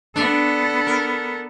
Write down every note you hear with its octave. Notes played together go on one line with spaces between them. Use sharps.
B3 D4 A4
A#4